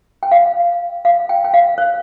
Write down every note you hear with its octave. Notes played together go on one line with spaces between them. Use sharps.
G5
F5
F5
G5
G5
F5
C#5